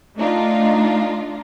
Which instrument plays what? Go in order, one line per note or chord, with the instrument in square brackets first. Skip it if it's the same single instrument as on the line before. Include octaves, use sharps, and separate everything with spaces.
[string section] A3 D4 D#4 F4